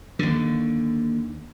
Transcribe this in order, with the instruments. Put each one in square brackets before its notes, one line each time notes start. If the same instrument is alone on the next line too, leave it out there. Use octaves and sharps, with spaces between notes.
[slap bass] D#2 D3